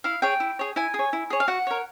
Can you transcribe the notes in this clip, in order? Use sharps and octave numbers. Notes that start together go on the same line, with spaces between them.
E4 F5
G#4 C#5 G5
E4
G#4 C#5
E4 G#5
G#4
C#5
E4
G#4 C#5
F5
F#4 F#5
A#4 C#5